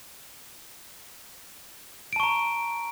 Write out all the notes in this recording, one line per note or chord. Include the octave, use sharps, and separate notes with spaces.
A5 A#5 C#6 D7